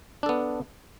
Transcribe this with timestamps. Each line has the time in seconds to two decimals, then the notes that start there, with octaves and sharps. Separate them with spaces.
0.23 D4
0.26 A4
0.29 B3